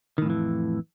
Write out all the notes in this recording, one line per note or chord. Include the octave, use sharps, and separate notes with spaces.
F2 A2 D#3 E3